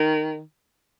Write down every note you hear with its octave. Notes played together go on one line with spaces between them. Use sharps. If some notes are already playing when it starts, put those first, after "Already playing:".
Already playing: D#3